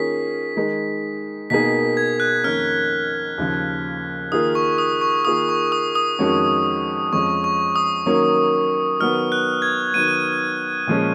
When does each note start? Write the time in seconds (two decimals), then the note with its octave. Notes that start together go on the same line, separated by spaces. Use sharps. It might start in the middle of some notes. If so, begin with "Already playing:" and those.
Already playing: D#3 A#3 C#4 F4 G#4 B6
0.56 D#3 G#3 D#4 G#4
1.50 B2 A#3 D#4 G#4 B6
1.97 G#6
2.20 F#6
2.44 F2 D#3 A#3 C#4 F6
3.38 D#2 C#3 F3
4.32 D#3 A#3 F4 G#4 D#6
4.55 C#6
4.78 D#6
5.01 C#6
5.25 D#3 A#3 F4 G#4 D#6
5.49 C#6
5.72 D#6
5.95 D#6
6.19 F2 D#3 G#3 C#4 F#4
7.13 F2 F3 G#3 C#4 C#6
7.44 C#6
7.76 D#6
8.06 D#3 F#3 A#3 C#4
9.00 D#3 F#3 B3 F6
9.32 F#6
9.62 G#6
9.94 D#3 F#3 B3 D#7
10.87 A#2 F3 G#3 C#4